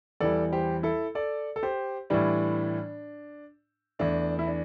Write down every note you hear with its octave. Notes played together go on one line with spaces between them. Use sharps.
E2 E3 G3 A4 D5
G4 C5
E4 A4
A4 D5
A4
G4 C5
A2 E3 G3 D4
E2 E3 A3 D4
E4
D4